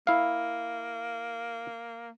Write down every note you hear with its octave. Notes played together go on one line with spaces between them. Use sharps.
A#3 E4 F5